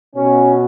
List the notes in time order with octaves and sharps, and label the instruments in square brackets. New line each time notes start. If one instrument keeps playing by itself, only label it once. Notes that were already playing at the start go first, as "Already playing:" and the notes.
[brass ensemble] B2 C#4